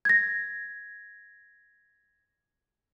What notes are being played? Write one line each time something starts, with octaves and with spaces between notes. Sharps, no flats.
G#6 A#6